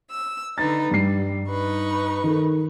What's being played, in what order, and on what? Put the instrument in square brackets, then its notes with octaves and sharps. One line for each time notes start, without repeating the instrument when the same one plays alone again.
[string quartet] E6
[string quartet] D3 D#4 B4 [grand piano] A6
[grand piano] G2 C7 [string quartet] G3
[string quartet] D#4 B4 C#6
[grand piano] D#3 A4